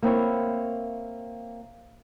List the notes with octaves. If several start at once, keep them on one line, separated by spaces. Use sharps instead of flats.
A#3 C4 E4 C#5